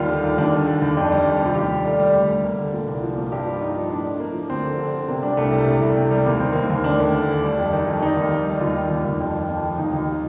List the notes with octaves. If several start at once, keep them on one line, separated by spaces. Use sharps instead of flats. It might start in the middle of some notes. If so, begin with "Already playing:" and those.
Already playing: D#2 D#3 G3 F4
D3
D#2
D#2 D4
D3
D3
D#2
F2 D4
G3
F2
C3 F4
D#2 G4
G3
G3 A3
G3
D2
D2
D2 A#3
D3
A#2
C2
F3
A#2
G2 G4
F3
F4
F3 D#4
F3
A2 D4
F3
F3 A#3
F3
D2 C4
D3
D3
D3
C3 A#3
G3 D4
C2 A3
C3 G3
C2 A3
C2
C3
G3
D#2 A#3
D#3 C4
D#2 A#3
D#2
D2 D4
D2
D3
D2
G3
F2
D#3
F2
G3 D#4
D#2
D#3
G3
D#2 F4
G3
D#2
D#2
F2
F3
F2
F3
D#2 D#4
D#2
F4
G4